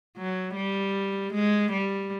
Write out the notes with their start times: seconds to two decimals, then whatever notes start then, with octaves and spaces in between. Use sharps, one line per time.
0.17 F#3
0.56 G3
1.34 G#3
1.72 G3